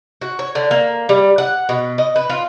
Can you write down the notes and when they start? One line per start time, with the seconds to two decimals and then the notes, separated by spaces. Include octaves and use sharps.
0.21 F#4
0.39 C#5
0.55 D3
0.71 A#3
1.09 G3
1.38 F#5
1.69 B2
1.98 D#5
2.16 B4
2.29 F4